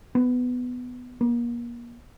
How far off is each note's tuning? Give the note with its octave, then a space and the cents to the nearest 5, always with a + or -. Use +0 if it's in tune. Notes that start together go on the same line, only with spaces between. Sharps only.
B3 +10
A#3 +35